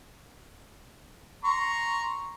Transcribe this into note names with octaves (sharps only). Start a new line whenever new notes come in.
A#5 C6 C#6